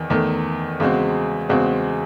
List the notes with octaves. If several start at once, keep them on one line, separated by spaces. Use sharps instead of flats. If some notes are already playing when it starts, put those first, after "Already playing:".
Already playing: E2 D#3
E2 D#3 A3
E2 C#3 G#3 C4 F#4
E2 C#3 G#3 C4 F#4